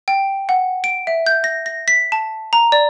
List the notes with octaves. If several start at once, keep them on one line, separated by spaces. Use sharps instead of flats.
G5
F#5
D7
E5
G6
A#6
A#6
B6
A5
A#5
D5